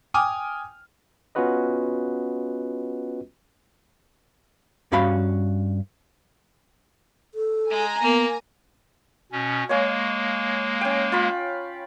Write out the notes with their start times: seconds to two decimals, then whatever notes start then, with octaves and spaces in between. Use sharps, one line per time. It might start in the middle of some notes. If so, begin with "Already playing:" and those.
0.14 G5 G#5 D6 D#6 F6
1.35 B3 C#4 F4 F#4 B4 D#5
4.92 G2 C#4 F#4 F5 B5
7.35 A4
7.70 G#3 G#5 A#5
8.02 A#3 B3
9.32 B2 C#4
9.69 G#3 A#3 C#5 F5 G#5
10.81 C#4 G5
11.12 F4 B5